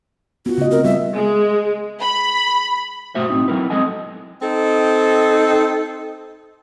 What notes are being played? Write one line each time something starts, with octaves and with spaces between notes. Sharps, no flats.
B3 F4 F#4
C#3 A3 D#5
C4 A#4
G3 E5
G#3
B5
G2 B2 A3 F#4 C5 E5
B1 F#2 A2 C4 D#4
F#3 C4 E4 A#4 B4
F#3 G#3 C4 A4 D#5 G#5
C4 D#4 A4